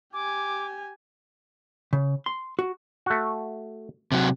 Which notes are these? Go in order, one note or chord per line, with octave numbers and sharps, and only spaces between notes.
G4 G#5 D6
C#3
C6
F#4
A3 F#4
C3 F#3